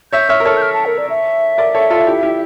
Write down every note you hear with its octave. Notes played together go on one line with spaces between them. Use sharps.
C#5 E5 G6
C#5 E5 F6
A#4
A4 C#5 F6
G6
F6
A5
A#4
D5
E5
A#4 D5
A4 C#5
F4 A4
E4 G4
E4 G4